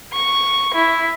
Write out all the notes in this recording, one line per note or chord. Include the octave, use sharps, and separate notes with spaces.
C#6
E4